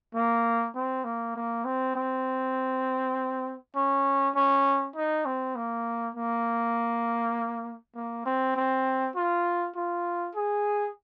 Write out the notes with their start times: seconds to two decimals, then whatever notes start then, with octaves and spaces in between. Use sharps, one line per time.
0.15 A#3
0.75 C4
1.04 A#3
1.36 A#3
1.65 C4
1.95 C4
3.76 C#4
4.35 C#4
4.96 D#4
5.25 C4
5.55 A#3
6.15 A#3
7.95 A#3
8.26 C4
8.56 C4
9.15 F4
9.76 F4
10.35 G#4